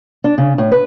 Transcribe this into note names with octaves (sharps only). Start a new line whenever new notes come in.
D4
C#3
A2
B4